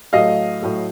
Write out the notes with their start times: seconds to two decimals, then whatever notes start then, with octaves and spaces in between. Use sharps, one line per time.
0.13 A2 F#3 A3 D#5 F5
0.62 A2 F#3 A3